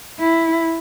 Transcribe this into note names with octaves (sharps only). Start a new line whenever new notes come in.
E4